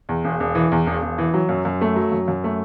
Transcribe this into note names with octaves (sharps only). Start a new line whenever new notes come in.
E2
E1
E1
E3
E2
E1
E1
E3
F#3
F#2
F#2
A3
F#3
F#2
F#2
A3